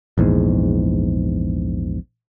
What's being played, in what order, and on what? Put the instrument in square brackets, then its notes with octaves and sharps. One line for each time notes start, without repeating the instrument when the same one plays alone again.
[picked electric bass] A#1 E2 G#2